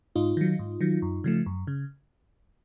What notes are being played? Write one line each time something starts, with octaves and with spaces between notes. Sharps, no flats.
G#2 D#4 F4
D#3 F#3
G#2
D#3 F#3
F#2
C#3 F3 A3
F#2
C#3